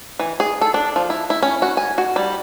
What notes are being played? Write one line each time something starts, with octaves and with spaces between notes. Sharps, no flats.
E3
G#4
A4
D4
F3
E4
E4
C#4
F#4
G#5
F#4
G3